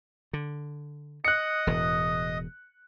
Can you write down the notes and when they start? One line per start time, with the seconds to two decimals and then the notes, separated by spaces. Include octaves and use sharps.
0.33 D3
1.25 D#5 D#6 F#6 C#7
1.67 E1 E2 A2